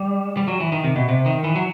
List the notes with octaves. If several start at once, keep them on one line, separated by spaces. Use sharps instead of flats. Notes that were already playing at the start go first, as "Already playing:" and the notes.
Already playing: G3
G3
F#3
E3
D#3
C3
B2
C3
D#3
E3
F#3